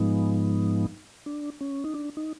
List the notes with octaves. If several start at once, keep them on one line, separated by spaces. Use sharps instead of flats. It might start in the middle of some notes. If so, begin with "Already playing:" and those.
Already playing: G#2 F3 G#3 B3 D#4
D4
C#4
D#4
D4
D#4